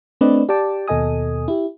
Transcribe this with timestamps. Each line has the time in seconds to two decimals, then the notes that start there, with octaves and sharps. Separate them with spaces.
0.21 A3 C4 D4 B4 D5 D#5
0.49 G4 D5 G5 A5 D6
0.88 D#2 B2 A4 D#5 G#5 D#6
1.48 E4 G4